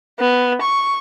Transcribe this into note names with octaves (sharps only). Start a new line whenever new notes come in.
B3
C#6